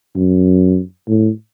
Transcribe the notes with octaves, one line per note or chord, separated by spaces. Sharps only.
F#2
A2